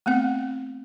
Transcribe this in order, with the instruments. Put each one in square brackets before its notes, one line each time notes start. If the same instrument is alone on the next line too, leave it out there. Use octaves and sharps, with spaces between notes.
[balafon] A3 B3 C4 F#5